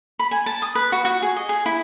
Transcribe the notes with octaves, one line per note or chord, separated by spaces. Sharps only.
B5
G#5
A5
D#6
B4
F#4
F#4
G#4
D#5
G#4
E4